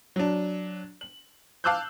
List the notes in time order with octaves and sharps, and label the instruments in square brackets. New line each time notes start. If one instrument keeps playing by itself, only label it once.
[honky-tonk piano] F#3 D4
F#7
F5 A5 D6 E6 F#6 G6